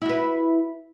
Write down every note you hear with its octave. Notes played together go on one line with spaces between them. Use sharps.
E4 F#4 B4